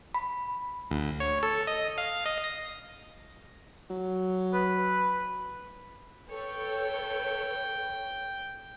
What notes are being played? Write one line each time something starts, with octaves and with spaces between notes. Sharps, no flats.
B5
D2
C#5
A4
D#5
F5
D#5
A#6
F#3
B4
A4 B4 C#5 G5